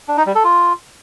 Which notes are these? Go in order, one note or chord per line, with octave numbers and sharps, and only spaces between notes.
D4
D#4
G3
A4
F4